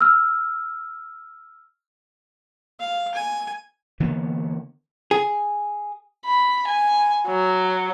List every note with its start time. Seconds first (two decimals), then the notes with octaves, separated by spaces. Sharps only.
0.01 E6 F6
2.80 F5
3.15 G#5
4.00 D3 E3 A#3 B3
5.11 G#4
6.26 B5
6.68 G#5
7.27 F#3